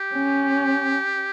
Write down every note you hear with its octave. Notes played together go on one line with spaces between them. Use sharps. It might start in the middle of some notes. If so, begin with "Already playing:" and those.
Already playing: G4
C#4